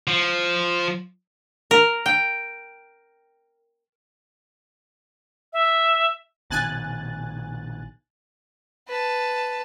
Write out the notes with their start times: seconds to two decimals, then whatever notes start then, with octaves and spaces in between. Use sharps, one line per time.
0.07 F3
1.71 A#4
2.06 G5
5.53 E5
6.50 A#1 B2 D#3 G#5 F#6 A6
8.88 B4 A5